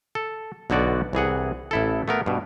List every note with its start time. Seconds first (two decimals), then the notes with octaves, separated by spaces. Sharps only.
0.15 A4
0.70 B1 D3 B3 F#4 D5
1.13 C2 E3 G#4 F#5
1.71 A1 E4 A4
2.08 A3 B3 A#4
2.26 G2 B2